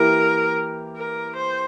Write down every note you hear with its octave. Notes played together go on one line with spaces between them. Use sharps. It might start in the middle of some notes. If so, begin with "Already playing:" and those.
Already playing: E3 A#3 E4 G4 A#4
A#4
C5